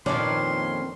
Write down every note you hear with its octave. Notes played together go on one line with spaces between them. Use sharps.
F2 A#2 D#3 C#4 D4 B4 F5 C6